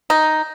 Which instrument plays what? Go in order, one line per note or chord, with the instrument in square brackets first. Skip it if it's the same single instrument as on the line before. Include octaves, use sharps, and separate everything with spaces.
[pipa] D#4